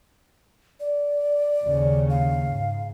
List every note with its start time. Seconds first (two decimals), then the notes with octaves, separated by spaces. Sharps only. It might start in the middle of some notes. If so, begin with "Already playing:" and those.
0.80 D5
1.65 D#2 C#3
2.10 F5
2.48 G#2